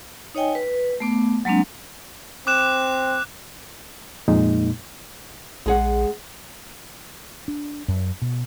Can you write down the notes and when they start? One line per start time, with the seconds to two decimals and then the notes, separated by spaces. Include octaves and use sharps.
0.35 D#4 C#5 D#5 G5 G#5
0.55 B4
1.00 A3 B3 D6
1.45 F#3 G#3 A#3 C4 D4
2.47 C4 D6 F#6 E7
4.28 F2 A#2 G#3 A#3 D#4
5.66 A#1 G#3 G#4 F#5
7.48 D4
7.88 F#2
8.22 B2